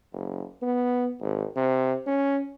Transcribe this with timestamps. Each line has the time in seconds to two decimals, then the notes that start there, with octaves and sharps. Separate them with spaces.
0.13 F#1
0.62 B3
1.21 G#1
1.56 C3
2.06 C#4